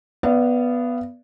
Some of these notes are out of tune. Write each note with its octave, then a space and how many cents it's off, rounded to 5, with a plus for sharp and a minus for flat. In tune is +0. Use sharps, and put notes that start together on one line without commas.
B3 +0 D5 +0 F5 -40